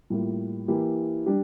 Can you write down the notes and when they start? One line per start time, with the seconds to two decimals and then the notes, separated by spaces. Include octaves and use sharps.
0.10 A2 G3 A#3 F4
0.68 E3 A#3 E4 G4
1.26 G3 D4 G4